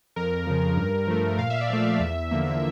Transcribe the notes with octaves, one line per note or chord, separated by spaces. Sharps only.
F2 A#4
C#3 F3
G2
F3 A3
A#2 F5
E5
D5
F3 A3 E5
E2
D3 F3 A#3